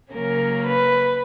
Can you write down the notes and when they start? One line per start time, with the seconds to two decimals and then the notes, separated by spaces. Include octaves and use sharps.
0.13 C#3 F#3 A#3 C#4 A#4
0.65 B4